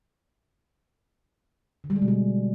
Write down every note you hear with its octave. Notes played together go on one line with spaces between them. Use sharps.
D3
G3
G#3
B2
G3